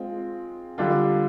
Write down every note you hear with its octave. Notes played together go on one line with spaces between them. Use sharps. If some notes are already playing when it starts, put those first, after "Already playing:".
Already playing: G#3 C4 F4
D3 G3 D4 F4